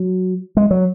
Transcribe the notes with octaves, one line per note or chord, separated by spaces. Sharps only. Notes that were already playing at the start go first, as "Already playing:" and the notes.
Already playing: F#3
G#3
F#3